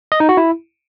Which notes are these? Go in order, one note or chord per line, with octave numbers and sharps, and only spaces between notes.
D#5
D#4
F#4
E4